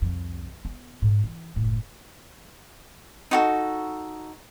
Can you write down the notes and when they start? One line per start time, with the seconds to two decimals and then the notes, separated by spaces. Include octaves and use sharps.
0.02 C2 F2
0.65 B3
1.02 G#2
1.24 E3
1.56 F#1 A2
3.31 D#4 F#4 A4